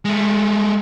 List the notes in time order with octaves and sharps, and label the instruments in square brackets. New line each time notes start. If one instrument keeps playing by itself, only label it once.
[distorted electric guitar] G#3 A3